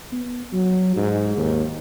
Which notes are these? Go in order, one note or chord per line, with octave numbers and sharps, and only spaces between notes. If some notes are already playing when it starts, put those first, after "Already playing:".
B3
F#3
G#2
D#2